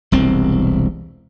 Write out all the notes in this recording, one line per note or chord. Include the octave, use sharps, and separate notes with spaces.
E1 C2 C4